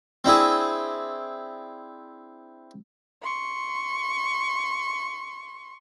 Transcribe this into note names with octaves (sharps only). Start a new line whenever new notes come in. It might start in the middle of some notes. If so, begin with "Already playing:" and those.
C4 D4 E4 G#4
C6 C#6